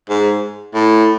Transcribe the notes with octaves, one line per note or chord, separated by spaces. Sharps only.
G#2
A2